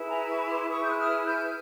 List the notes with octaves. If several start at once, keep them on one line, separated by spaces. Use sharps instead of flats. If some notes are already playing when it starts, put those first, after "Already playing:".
Already playing: E4 G#4 B4
G#5 A#5
B5 C#6
C6 D6
E4 G#4 B4 C#6 D#6
G6
F#6
D#6 F6
F6 G6